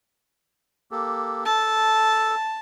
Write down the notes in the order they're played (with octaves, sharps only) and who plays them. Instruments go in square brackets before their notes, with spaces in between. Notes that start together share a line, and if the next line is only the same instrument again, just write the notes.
[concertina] A#3 G4 A4
[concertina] A4 [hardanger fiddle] A5